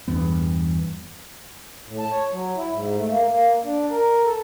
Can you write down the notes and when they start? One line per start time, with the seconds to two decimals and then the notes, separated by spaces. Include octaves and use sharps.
0.08 E2 G2 E3 B3
1.86 A2
1.99 A5
2.11 C#5
2.32 F#3
2.56 E4
2.70 G#2
2.97 A3
3.09 A#3
3.28 A#3
3.64 D4
3.90 A#4
4.25 A4